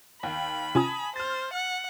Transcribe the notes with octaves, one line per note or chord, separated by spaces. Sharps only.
D#2 G5 B5
C3 C#4 F4 G#5 A5 D#6
C5 F6 A6
F#5